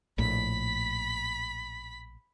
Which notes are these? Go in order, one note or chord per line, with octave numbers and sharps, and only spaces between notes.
A#1 A2 B5 B6